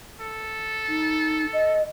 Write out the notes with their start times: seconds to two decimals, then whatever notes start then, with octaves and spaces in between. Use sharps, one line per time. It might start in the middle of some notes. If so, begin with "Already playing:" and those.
0.21 A4
0.89 D#4
1.53 D#5